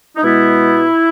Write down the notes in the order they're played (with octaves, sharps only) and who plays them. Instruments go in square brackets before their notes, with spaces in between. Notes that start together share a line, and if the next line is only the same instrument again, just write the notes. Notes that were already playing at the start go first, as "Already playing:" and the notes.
[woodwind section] D#4
B2 G#3 B3 E4